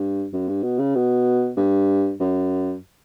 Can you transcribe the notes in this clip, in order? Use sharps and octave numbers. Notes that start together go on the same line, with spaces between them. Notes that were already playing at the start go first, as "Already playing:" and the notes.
Already playing: G2
F#2
G2
B2
C#3
B2
G2
F#2